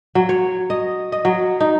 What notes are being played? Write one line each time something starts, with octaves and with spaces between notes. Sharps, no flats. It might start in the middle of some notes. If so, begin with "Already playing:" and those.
F#3
C#5
D#5
D#5
F#3
D#4